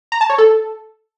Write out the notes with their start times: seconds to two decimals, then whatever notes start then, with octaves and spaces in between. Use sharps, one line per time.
0.12 A#5
0.21 A5
0.30 C#5
0.38 A4